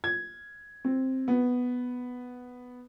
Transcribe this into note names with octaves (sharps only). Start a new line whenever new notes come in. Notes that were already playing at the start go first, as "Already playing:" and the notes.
G#6
C4
B3